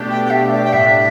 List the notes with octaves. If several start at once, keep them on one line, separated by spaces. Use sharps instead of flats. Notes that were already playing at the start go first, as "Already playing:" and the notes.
Already playing: B2 A3 D4 G4
G5
G5
E5
D5
G5
A2 G3 D4 E5